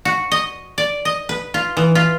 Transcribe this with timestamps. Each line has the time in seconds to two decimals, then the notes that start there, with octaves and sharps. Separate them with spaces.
0.05 F#4
0.31 D#5
0.78 D5
1.05 D#5
1.29 B4
1.54 F4
1.77 E3
1.95 F4